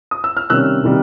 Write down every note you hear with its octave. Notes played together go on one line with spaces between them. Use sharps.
D#6
E6
F6
C3 D#3 G3 A#3 C#4 E6 F#6
C3 D#3 G3 A#3